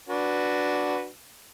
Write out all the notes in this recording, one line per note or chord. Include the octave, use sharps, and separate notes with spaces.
D4 F#4 B4